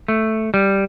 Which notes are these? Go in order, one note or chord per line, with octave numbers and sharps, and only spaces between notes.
A3
G3